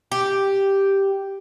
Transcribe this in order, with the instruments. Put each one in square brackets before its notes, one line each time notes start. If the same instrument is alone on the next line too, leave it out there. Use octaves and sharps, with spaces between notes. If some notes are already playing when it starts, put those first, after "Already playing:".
[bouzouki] G4